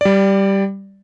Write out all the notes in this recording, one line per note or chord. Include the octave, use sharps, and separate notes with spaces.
G3 D5